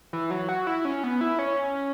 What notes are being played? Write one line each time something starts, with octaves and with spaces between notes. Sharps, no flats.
E3
F#3
F#4
E4
C#4
B3
E4
C#4